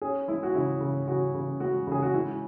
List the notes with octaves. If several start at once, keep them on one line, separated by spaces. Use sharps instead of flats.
C#4 G#4
G#3 E4
F#4
C#3 E4
C#3
C#3 F#4
C#3
G#3 F#4
C#3 G#4
F#4
G#3 E4